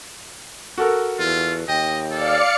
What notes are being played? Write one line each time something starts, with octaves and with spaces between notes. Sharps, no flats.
F#4 A4 A#4
E2 F4
D#2 D#5 G5
A4 D5 F5 C#7